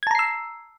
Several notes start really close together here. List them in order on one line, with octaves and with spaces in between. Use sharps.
G#6 A5 A#5 C7 E6